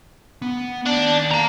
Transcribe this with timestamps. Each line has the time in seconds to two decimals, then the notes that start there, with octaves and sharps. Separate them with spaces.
0.42 B3
0.86 D#2 D4 A5
1.31 F5 A#5